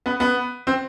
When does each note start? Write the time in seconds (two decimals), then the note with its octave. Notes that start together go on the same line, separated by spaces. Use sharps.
0.06 B3
0.20 B3
0.67 C4